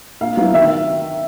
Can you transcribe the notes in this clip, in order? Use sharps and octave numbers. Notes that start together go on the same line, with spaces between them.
A#2 F5
F#3 B3 E4
D#3 E5